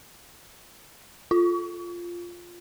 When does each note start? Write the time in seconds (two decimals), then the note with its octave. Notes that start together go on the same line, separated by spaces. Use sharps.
1.31 F4